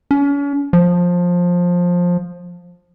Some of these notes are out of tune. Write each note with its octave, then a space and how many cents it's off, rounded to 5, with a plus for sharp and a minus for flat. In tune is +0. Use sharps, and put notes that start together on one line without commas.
C#4 +40
F3 +15